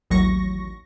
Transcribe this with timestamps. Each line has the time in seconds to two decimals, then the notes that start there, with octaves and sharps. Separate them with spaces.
0.10 A1 D#2 F#3 C#6 A#6